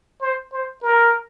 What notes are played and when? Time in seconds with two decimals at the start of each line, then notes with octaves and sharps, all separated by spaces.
0.22 C5
0.53 C5
0.83 A#4